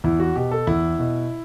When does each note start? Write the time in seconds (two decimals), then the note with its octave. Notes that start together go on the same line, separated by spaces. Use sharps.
0.04 E2 E4
0.19 F#4
0.36 B2 G4
0.51 A4
0.67 E2 E4
0.99 B2